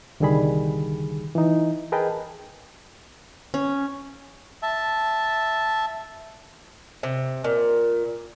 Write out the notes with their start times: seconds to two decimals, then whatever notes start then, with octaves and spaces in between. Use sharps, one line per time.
0.20 C2 D3 D#3 G3 G#4 B5
1.35 E3 D#4
1.92 G#4 A#4 B4 D#5 G5 A5
3.54 C#4
4.63 E5 A5
7.03 C3
7.44 A#2